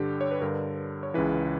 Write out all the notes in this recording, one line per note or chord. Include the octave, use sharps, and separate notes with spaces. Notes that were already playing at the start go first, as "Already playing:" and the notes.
Already playing: G2 D3 G4
C#5
B4
G2 D3 A#4
C#5
C#2 C#3 E3 B4